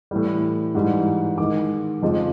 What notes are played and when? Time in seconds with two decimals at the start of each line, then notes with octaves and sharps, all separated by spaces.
0.11 A2 E3 G3
0.75 G#2 E3 G3
1.38 G#2 D#3 G#3 D6
2.02 F2 C#3 F3 G#3